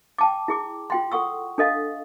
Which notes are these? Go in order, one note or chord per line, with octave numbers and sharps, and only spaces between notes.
G5 A5 D6
E4 G#4 D6
F4 G5 C6
A4 F#5 C#6 E6
D4 A4 D#5 F5